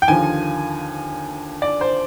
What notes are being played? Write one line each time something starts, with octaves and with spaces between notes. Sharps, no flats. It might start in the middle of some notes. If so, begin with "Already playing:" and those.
G5
D#2 D3 F3 G#5
D5
C5